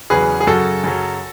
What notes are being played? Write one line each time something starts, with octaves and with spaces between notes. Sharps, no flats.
E2 C#3 F#3 G#4 B4
G#4
F#2 C#3 F#3 F#4 A4
F#2 C#3 F#3